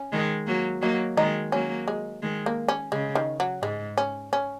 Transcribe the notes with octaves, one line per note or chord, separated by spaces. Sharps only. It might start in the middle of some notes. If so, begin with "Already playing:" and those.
Already playing: C#4
D#3 G#3
F#3 A#3
F#3 A#3 D#4
D#3 G#3 D#4
F#3 A#3 C#4
G#3
D#3 G#3
A#3
C#4
C#3 G#3
D#3
F#3
G#2 G#3
C#4
C#4